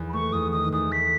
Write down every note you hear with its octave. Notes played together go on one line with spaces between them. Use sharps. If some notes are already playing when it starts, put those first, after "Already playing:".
Already playing: E2
B5
A3 C#6
E2 D#6
D#3 D#6
E2 D#6
A3 B6